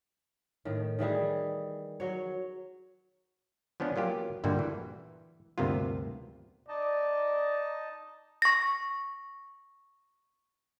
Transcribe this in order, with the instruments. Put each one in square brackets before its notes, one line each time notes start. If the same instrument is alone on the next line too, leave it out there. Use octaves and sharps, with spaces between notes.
[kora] A2 D#3
D#3 E3 G3 G#4
F#3 C#5
[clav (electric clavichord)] F3 B3 C#4 D4
F#3 A#3 F4 G4
G2 A#2 D3 G3 F#4
E3
D2 G2 C3 A#3 B3 F4
[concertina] D#4 D#5 A5 [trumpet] D5
[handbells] C#6 A#6